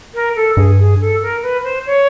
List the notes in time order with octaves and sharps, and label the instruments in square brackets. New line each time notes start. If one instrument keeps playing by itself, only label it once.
[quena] A#4
A4
[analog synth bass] G2 [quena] G#4
[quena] G#4
A4
A#4
B4
C5
C#5